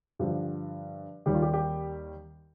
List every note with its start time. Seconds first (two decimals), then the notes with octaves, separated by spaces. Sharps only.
0.19 G2 D3 F3 G4
1.26 D#2 D#3 G3 G4
1.35 F4
1.42 G4
1.53 G4